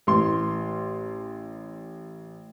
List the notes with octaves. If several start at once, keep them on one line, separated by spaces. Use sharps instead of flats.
A1 C6